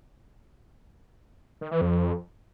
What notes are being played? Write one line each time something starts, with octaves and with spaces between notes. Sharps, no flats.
D#3
E3
F2